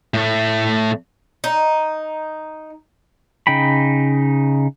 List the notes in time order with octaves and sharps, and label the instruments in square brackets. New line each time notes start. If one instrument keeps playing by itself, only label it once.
[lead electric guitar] A2 A3
[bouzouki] D#4
[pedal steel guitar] C#3 D#4 G5 B5